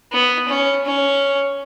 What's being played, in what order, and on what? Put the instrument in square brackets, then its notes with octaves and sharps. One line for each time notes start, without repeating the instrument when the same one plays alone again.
[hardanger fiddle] B3
C#4
C#4